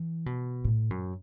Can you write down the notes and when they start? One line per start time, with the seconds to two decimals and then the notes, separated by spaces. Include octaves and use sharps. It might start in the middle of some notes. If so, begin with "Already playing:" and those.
Already playing: E3
0.26 B2
0.65 A2
0.91 F#2